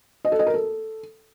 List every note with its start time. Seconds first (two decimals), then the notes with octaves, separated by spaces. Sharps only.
0.25 D#5
0.32 A4
0.39 D#5
0.47 A#4
0.54 A4